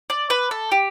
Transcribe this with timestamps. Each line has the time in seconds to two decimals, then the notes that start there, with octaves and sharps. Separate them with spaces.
0.10 D5
0.30 B4
0.51 A4
0.72 G4